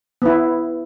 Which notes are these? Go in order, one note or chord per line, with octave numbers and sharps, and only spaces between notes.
B3 E4